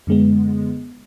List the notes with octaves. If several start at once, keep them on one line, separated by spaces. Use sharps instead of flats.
F#2 D3 G#3 B3